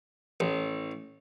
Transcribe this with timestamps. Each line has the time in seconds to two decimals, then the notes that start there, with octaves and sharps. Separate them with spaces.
0.40 A1